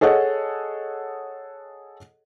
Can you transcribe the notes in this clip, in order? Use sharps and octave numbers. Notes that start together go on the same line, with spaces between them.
G#4 A4 C#5 D#5 F#5